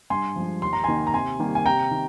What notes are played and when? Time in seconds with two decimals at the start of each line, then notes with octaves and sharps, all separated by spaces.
0.10 G2 G#5 C6
0.36 F3 G#3
0.62 D#2 C6
0.73 A#5
0.84 D#3 A#3 D#4 G#5 C6
1.07 A#5
1.14 C3 G#5 C6
1.39 D#3 G3 A#3
1.55 G#5
1.66 C3 G5 A#5
1.91 D#3